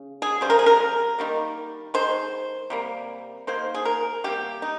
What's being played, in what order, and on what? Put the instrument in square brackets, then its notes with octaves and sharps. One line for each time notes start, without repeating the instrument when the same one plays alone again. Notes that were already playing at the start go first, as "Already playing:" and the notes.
Already playing: [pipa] C#3
G#4
C#3 G3 C5
A#4
G#4
A#4
D#3 G3 A#3
D#3 G#3 C5
C3 G3 A#3
D#3 A#3 C5
G#4
A#4
C3 G3 A#3 G4
D#4